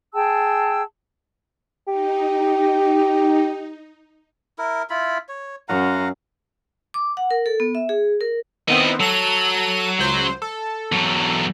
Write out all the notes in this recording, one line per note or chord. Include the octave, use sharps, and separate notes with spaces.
G#4 G5 A5 E6
D#4 G4
E4 A#4
E4 F4 B5
C#5
F#2 F5 F#5 A#5
D6
F#5
A#4
A4
B3
E5
G#4
A#4
D#3 B3 C4 E4 D#5
F#3 A4 D#7
C#2 C5
A4
E2 F#3